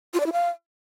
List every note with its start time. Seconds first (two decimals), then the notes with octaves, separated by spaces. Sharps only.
0.14 F4
0.20 D5
0.26 E4
0.33 F5